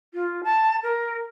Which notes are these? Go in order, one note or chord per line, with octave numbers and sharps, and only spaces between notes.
F4
A5
A#4